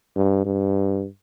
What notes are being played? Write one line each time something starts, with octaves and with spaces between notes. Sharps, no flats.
G2
G2